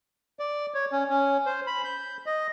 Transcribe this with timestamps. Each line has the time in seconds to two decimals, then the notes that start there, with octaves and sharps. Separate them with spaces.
0.39 D5
0.74 C#5
0.92 C#4
1.10 C#4
1.46 C5
1.67 B5
1.85 G6
2.26 D#5